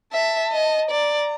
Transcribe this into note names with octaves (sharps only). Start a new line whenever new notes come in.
E5 A5
D#5
D5 A#5